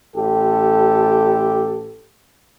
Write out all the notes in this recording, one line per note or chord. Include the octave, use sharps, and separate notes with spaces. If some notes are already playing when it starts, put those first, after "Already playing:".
A1 G4 A4